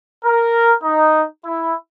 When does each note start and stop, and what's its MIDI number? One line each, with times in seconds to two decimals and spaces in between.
0.25 0.73 70
0.83 1.24 63
1.45 1.75 64